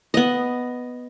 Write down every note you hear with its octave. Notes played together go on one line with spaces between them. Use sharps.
B3 D#5